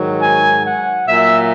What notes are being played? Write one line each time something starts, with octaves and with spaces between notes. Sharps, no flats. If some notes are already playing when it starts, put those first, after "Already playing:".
Already playing: G#2 D#3 F#3
G#5
F#5
A#2 F#3 E5